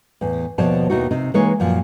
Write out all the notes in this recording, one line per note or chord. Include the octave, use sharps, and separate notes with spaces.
E2 A2
D#2 B2 F3 C#5 D5 A5
D#2 B2 D#3 D#4 E4 F#4
C3 C4 D#4
E3 G#3 A#3 D#4 B4 C#5
F#2 A#2 F3